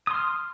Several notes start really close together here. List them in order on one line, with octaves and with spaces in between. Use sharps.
D#6 C6 F6